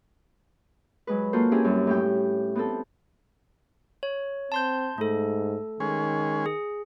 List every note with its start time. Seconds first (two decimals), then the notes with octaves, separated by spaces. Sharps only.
1.07 F#3 G#3 B4
1.33 A#3 F4 F#4 A4 C5
1.52 C4 C#4 E4 G4 G#4
1.64 F#2 G3
1.87 A2 G4 G5
2.55 B3 C4 A4
4.03 C#5
4.52 C4 A5 C6 G6
4.98 G#2 A3 A4
5.80 D#3 G#3 C#4 G#4
6.46 G#4